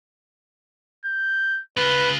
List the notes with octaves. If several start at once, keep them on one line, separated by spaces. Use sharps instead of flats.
G6
C#3 F4 B4